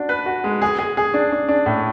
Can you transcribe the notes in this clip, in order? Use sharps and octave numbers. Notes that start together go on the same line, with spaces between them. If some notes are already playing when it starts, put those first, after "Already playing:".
Already playing: D4 F#4
B4
F#4
G#3
G#4
G#4
G#4
D4
D4
D4
A2